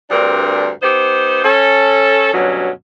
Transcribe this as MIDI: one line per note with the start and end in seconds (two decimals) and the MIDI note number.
0.10 0.68 38
0.10 0.68 43
0.10 0.68 60
0.10 0.68 62
0.10 0.68 70
0.82 1.42 59
0.82 1.42 63
0.82 1.42 67
0.82 1.42 72
1.44 2.31 61
1.44 2.31 69
2.33 2.69 38
2.33 2.69 43
2.33 2.69 47
2.33 2.69 54
2.33 2.69 61